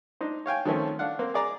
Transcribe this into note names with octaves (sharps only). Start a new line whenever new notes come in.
D4 D#4 C5
C#5 F5 G5 G#5
D#3 F3 A3 C4 C#4
D4 F5 F#5
A#3 C4
G#4 D5 A#5